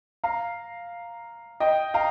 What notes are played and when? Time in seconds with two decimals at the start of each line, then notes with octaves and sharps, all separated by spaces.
0.24 F5 A#5
1.60 D#5 G5
1.94 F5 A#5